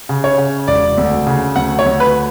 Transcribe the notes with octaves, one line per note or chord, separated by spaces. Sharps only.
C#3
C#5
C#3
E1 D5
D2
C#3
D2 F#5
C#5
D2
B4